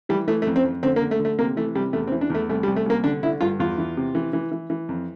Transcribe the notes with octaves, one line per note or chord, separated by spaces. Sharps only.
E3 G3
E3 A3
A3
F2
C4
F2
D3 C4
A#3
D3
A3
D3
A3
C3 A#3
E3 A3
C3 G3
E2 A3
C4
E3
D4
E2 A3
C2 A3
G3
C2
A3
C2 A#3
D3 D4
D3 E4
G2 F4
E2 F4
E3
C3
E3
E3
E3
E3
F2